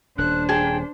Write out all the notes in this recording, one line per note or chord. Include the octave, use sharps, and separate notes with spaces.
D#1 D4 C5 F#6
G#4 G5 A5